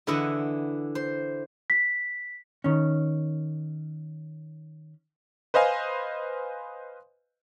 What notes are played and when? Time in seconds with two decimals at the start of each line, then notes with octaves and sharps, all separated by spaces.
0.07 D3 E3 E4 D#5 F#5
0.95 C5
1.70 B6
2.64 D#3 C#4
5.54 B4 C5 D#5 F5 G#5